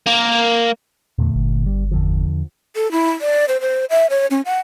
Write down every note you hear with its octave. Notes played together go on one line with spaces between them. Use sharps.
A#3
E2 A#2 D3 A3
G1
G3
E2 D3 F3
A4
E4
D5
C5
C5
E5
C#5
C#4
F#5